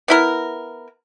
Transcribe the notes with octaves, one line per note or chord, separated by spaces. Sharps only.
B3 E4 A#4